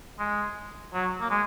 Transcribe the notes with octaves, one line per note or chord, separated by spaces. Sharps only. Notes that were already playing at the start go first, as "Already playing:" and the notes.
G#3
F#3
A#3
G#3